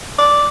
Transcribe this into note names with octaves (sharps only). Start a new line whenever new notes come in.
D5